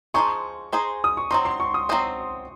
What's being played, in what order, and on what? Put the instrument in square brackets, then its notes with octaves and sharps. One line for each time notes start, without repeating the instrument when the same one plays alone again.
[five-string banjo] F3 G#3 D#4 G#4 C5 [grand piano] C#6
[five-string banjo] G#3 D#4 G#4 C5
[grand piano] D#6
C#6
[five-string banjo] F#3 C4 D#4 [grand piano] C6
[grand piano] C6
C#6
D#6
[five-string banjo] F#3 C4 F#4 C5 D#5